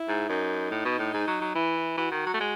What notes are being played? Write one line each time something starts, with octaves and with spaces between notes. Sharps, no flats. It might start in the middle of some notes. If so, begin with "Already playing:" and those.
Already playing: E4
G#2
F#2 D#4
A2
B2
A2
G#2
F#3
F#3
E3 E4
E4
E3 F#4
D#3
F#3
A3
G#3